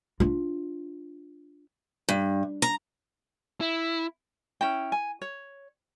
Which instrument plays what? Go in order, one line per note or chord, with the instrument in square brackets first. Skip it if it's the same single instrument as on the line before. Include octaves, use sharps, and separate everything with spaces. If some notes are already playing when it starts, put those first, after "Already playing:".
[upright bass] D4 F4
[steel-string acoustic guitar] G2
A#5
[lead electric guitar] E4
[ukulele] C#4 E4 G5
G#5
C#5